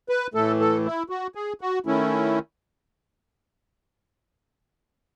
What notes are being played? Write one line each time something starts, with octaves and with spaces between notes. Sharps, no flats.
B4
A2 E3 A3 A4
A4
E4
F#4
G#4
F#4
D#3 A3 C#4 E4